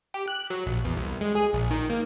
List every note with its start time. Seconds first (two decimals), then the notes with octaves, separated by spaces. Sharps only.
0.14 G4
0.28 F#6
0.50 F#3
0.66 A#1
0.85 E2
0.97 C2
1.21 G#3
1.35 G#4
1.53 A#1
1.71 D#3
1.90 A#3